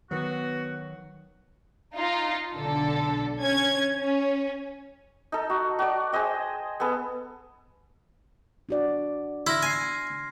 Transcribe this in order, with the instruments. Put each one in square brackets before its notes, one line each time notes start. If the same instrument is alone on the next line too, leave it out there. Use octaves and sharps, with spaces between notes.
[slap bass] D#3 F#3 [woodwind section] B3 F#4
[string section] D#4 F4
B1 D3 A4
C#4 G#6
C#4
[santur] D#4 A4
F#4
F#4 D5
G#4 C5 D#5 G5
B3 G#4 A4
[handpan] D4 F#4 D5
[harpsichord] E4 [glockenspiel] C6 F6 A#6
[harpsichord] G#5 [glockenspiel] G#6 C7